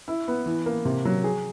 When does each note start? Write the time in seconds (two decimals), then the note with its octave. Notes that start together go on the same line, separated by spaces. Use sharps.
0.08 E4
0.28 B3
0.46 E3
0.66 A#3
0.85 C3
1.05 F#3
1.24 G#4